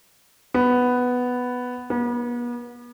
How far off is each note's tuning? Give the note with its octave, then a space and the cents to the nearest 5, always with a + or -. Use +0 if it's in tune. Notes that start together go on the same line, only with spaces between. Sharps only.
B3 +5
B3 -40